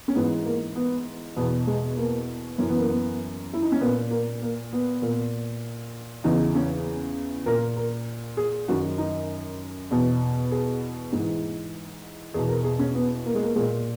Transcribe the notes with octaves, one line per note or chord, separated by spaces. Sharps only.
C#4
G#2 E3 B3
A#3
B3
E2 B2 B3
G#3
A#3
F#2 E3 C#4
B3
A#3
B3
E4
D#4
C#4
A#2 B3
A#3
A#3
B3
A#2
E2 C#3 E3 D#4
C#4
A#2 A#4
A#4
G#4
F#2 D#3 F#4
D#4
E2 B2
G#4
G#2 E3
E2 B2 G#4
A#4
G#4
C#4
B3
A#3
G#3
A#3
A#2 G#3